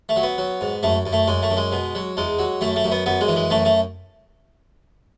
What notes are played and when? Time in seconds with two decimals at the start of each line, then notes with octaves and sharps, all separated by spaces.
0.09 A3
0.16 F#3
0.23 B3
0.38 F#3
0.61 G#2
0.83 F#2 A3
1.06 F#2
1.13 A3
1.27 F#2 G#3
1.43 A3
1.50 F#2
1.57 G#3
1.72 B2
1.95 F#3
2.17 E2 G#3
2.39 F#3
2.61 F#2 A3
2.76 A3
2.84 F#2
2.92 B3
3.06 F#2 B3
3.21 G#3
3.28 E3
3.36 G#3
3.50 F#2 A3
3.65 A3